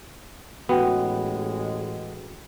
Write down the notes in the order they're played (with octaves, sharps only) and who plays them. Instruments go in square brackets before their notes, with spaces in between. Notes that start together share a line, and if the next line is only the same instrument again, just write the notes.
[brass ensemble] A1 G#3 [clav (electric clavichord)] B3 [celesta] F#4 G5